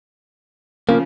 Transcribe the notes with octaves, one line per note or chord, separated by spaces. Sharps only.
C#3 F3 A#3